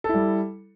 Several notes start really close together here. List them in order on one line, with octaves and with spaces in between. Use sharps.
A4 E4 G3